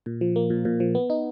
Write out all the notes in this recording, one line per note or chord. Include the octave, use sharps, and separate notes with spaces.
A#2
F3
A#3
A#2
A#2
F3
B3
D#4